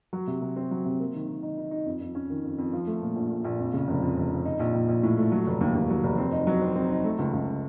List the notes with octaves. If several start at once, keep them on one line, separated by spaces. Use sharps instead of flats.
F#3
C3
C3
C4
F#3
C3
A#3
D#3
D#3
D#4
D#4
D#4
F2
F2
C#4
D#3
F2
F2
F3
A3
A#2
A#1
A#2
A#1
F2
C#3
F1
F2
F1
F2
D#4
A#1
A#1
A#1
A2
A3
F#3
F1
D#2
D#2
F#3
F1
C4
D#4
F#3
C4
C4
D#4
A3
C#2
C#2